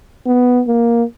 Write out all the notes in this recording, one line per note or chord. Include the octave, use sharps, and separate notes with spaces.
B3
A#3